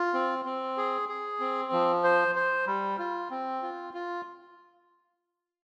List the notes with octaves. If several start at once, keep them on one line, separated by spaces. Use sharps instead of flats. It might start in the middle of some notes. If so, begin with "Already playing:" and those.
Already playing: F4
C4
C4
G#4
G#4
C4
F3
C5
C5
G3
F4
C4
F4
F4